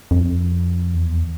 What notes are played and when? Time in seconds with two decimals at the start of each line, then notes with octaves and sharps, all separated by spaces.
0.11 F2
0.94 E2